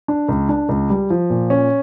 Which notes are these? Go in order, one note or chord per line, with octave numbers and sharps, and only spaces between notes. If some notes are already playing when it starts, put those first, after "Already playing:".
D4
C#2
D4
C#2
G3
F3
A#2
C#4